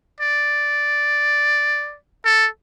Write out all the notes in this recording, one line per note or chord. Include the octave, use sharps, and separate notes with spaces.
D5
A4